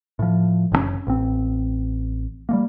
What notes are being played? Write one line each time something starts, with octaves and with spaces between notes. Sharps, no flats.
A2 F3
F#1 C#3 C#4
A1 C4
G3 A3 A#3